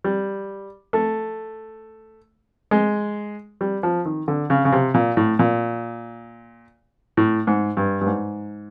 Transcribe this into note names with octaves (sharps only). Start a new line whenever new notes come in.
G3
A3
G#3
G3
F3
D#3
D3
C#3
C#3
C3
A#2
A2
A#2
A2
G#2
G2
G2
G#2